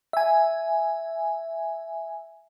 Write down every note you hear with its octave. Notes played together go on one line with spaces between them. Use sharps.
E5 G#5